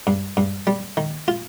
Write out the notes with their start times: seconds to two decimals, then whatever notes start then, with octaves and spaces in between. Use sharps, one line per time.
0.07 G2
0.37 G2
0.67 G3
0.97 D#3
1.28 F4